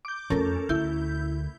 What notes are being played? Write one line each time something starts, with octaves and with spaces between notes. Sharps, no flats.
D6 G6
F2 A3 C#4 A4 A#4
D2 E4 G6